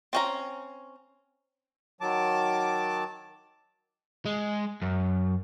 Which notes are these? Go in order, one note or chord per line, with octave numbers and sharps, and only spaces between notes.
C4 C#4 A#5
D#3 F#3 A5 D6
G#3
F#2